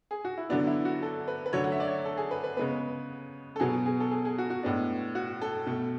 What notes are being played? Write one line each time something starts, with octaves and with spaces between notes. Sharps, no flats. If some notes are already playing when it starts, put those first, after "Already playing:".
G#4
F#4
E4
D3 F#3 B3 D4
E4
F#4
A4
B4
B4
D3 F#3 A3 C#5
F#5
E5
D5
C#5
A4
G#4
B4
B4
C#3 G#3 B3 B4
A4
B2 F#3 B3 G#4
G#4
A4
G#4
G#4
F#4
F#4
A2 G#3 B3 D4
F#4
A4
B2 A3